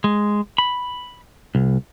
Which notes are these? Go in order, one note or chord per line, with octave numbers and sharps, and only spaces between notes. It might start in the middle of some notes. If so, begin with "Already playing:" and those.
G#3
B5
C2